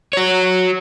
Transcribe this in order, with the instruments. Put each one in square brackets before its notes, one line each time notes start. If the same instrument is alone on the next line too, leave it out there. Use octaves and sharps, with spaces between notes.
[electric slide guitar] F#4 C#5